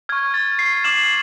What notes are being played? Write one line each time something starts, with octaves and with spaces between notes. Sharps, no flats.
C#6 F6 G#6
A6
C7
D6 F6 E7 F#7